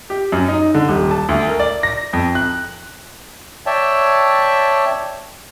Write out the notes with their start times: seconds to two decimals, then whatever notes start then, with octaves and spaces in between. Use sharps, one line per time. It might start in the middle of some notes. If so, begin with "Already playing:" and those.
0.10 G4
0.32 F#2
0.48 D#4
0.74 D3
0.88 D#1
1.11 A5
1.29 D2
1.48 A#4
1.60 D5
1.83 A#6
2.13 F2
2.35 F#6
3.66 C#5 D5 E5 G5 A5